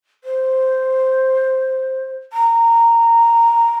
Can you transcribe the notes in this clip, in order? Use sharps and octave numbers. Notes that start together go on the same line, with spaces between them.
C5
A#5